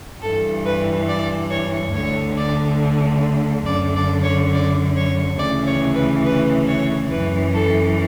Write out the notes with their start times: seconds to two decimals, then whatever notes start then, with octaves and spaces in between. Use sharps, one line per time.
0.22 G2 E3 A4
0.65 B4
1.08 D5
1.50 C#5
1.94 D2 D3 C#5
2.37 D5
3.66 F#2 D3 D5
3.95 D5
4.23 C#5
4.52 D5
4.95 C#5
5.38 D2 C#3 E3 D5
5.66 C#5
5.95 B4
6.24 B4
6.67 C#5
7.09 F#2 E3 B4
7.53 A4